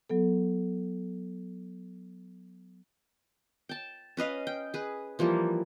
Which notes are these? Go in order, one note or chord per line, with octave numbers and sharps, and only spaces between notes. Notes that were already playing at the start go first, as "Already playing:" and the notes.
F#3 B3 A4
G5 A5
C#4 B4 D#5 F5
G5
G#4 B4
E3 F3 G3 A#3